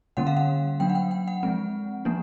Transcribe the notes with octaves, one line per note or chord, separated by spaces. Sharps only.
D3 G3 A#3 C#4 F#5
F5
F#5
F#3 A#3 D4 G5
F#5
G5
G5
F#5
F3 G#3 C4
F3 A#3 D4